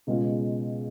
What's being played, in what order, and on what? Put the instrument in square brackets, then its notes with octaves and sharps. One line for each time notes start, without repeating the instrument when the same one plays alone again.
[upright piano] C#2 B2 G#3 C#4 F4